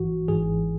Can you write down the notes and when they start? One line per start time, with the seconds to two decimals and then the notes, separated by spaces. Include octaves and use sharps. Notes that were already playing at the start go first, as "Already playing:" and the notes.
Already playing: A1 G#2 E3 F#4
0.28 G#1 G#2 E3 G#4